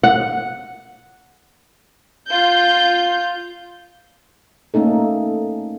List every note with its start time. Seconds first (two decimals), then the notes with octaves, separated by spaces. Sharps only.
0.03 F#5
2.29 F4 G6
4.74 A3 A#3 C#4 D#4 A4